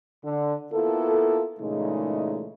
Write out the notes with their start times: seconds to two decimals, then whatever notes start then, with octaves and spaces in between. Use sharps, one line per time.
0.24 D3
0.73 A#3 B3 E4 F4 A4
1.60 A#2 C#3 E3 G#3 A3 D#4